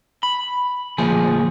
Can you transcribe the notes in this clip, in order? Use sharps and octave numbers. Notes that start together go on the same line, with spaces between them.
B5
D2 A#2 F3 G#4